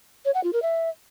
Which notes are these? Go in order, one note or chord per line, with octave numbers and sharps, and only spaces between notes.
C#5
F#5
F4
A#4
E5